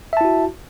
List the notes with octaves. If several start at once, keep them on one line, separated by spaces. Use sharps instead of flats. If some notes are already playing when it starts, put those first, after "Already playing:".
E4 F#4 E5 A5